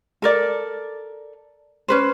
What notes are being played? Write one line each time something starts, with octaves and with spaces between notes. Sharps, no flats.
A4 A#4 D5
C#4 B4 C5